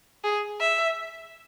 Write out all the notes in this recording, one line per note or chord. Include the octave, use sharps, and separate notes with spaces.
G#4
E5